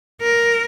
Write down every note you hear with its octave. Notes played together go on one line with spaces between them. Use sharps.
A#4